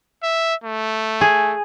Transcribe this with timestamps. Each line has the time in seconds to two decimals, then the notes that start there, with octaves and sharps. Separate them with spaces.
0.23 E5
0.64 A3
1.21 G#4